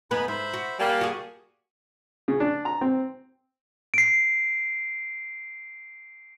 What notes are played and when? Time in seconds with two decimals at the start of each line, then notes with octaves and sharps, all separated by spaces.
0.11 F#2 B3 D#4 B4 G#5 B5
0.28 G#2 C5 E5 B5
0.54 F#4
0.79 G3 A#3 G#5 A5
1.01 F#4 G#4
2.28 C#3
2.40 D4
2.65 A#5
2.81 C4
3.94 C7 D7